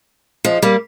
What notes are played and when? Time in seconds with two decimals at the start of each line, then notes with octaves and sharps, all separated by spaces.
0.44 F3 G#3
0.62 G3 A#3